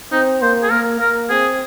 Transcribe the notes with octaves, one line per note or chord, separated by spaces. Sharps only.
C4 D#4
A#3 C5
G#4
A#3 A#4
A#3 A#4
C4 G#4